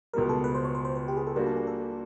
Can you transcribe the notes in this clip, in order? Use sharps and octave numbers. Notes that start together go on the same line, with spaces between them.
C#2 B2 G3 A#4
A4
B4
C5
C#5
C5
C5
B4
G4
G#4
A4
G3 A#3 D4 F#4 A#4
A4
G#4
A4